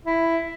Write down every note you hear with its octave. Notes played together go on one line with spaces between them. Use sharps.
E4